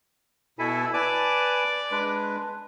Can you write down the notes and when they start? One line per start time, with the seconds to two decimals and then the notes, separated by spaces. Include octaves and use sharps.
0.59 B2 E4 A4 E5 G#5
0.94 B4 D5 G#5 A5 D6
1.91 G#3 D4 B4